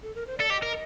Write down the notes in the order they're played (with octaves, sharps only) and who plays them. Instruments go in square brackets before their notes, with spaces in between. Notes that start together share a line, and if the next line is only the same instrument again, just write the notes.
[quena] A4
A#4
C5
[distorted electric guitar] A4 [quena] D5
[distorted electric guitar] G4 [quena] D#5
[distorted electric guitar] A#4